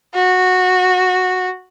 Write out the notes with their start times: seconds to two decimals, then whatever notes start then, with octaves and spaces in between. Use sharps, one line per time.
0.15 F#4